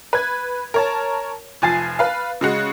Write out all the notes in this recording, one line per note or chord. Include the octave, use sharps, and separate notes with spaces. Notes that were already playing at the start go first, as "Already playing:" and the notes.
B4 G#6
A#4 C#5 A5
F1 F3 G#5 A6 C7
B4 F5
C#3 G#3 F#4